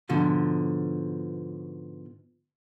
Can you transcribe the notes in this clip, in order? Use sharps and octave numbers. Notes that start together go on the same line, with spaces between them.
G#2 B2 D3 F3